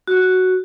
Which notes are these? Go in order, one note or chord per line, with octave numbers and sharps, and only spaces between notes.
F#4